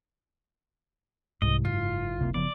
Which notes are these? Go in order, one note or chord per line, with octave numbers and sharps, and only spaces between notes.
C2 G#2 D#5
F#1 F4
C#2 C3 A#3
C#3 F3 B3 D5